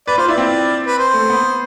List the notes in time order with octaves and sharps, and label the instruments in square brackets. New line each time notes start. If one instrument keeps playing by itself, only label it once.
[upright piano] B4 [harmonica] D5
[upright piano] F4 [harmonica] C5
[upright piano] E4 [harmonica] D5
[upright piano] C4
[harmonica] B4
C5
[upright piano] A3
B3